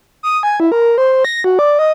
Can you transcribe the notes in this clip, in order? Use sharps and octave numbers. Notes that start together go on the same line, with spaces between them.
D#6
G#5
E4
A#4
C5
A#6
F#4
D5
D#5